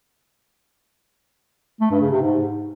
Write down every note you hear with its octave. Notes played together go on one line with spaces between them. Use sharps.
A3
G2
C#3
C3
G#2